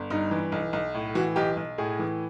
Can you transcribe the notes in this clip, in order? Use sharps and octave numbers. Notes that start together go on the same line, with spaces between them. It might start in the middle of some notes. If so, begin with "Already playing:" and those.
Already playing: G1
G2 D#4
E3
B1
B1
A2
E3 F#4
B1 G4
B1
A2 G#4
E3